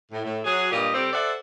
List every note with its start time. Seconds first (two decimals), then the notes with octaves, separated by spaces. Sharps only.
0.11 A2
0.24 A2
0.44 F#3 G#4
0.71 G2 A#2 G4 D#5
0.94 C3 G3 C4 G4 A4
1.13 A4 C5 D5 E5 F#5